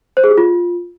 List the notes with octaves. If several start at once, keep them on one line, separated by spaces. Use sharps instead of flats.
C5
G#4
G4
F4